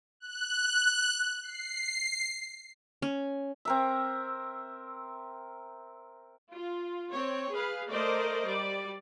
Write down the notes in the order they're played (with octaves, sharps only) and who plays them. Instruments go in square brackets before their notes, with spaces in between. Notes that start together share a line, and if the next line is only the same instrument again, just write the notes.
[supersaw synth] F#6
C7
[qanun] C#4
[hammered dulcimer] C4 A#4 E5
[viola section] F4
C4 C#5
G#4 B4 F5
A3 A#4 C5 D5 D#5
G3 D5